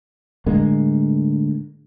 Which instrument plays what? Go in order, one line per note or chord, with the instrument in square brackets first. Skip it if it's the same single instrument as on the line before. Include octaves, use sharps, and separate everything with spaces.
[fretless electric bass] A2 D3 G#3 A#3